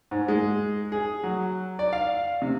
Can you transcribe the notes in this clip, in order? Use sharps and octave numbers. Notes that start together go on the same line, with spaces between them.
G#2
G#3
G#4
F#3
D5
F5
C3